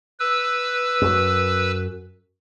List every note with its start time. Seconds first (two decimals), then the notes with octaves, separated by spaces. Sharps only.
0.20 B4 E6
1.02 F#2